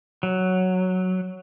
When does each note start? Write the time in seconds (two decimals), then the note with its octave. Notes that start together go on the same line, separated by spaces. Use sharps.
0.23 F#3